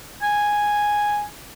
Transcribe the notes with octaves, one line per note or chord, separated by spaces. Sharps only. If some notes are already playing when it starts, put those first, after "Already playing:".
G#5